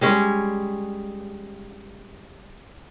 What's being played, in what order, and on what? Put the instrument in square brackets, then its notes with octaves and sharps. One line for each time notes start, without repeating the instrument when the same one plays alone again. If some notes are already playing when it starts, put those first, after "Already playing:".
[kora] G3 G#3 C#4